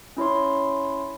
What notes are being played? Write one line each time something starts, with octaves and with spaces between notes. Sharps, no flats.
C#4 E4 C#5 C6